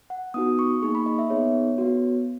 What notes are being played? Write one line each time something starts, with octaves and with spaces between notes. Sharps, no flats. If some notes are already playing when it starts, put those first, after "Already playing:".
F#5
B3 D#4 F#4 D#6
C#6
A#3 D#4 G#4 C#6
B5
D#5
E5
B3 D#4 G#4 C#5
B3 F#4